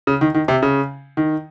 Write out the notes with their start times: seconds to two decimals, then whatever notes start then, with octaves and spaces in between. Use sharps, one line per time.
0.07 C#3
0.21 D#3
0.34 D#3
0.48 C3
0.63 C#3
1.17 D#3